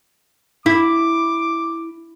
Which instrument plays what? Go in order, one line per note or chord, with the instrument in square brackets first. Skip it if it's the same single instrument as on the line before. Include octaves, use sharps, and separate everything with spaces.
[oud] E4 [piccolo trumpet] D6